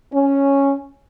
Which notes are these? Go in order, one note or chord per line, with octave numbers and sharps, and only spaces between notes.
C#4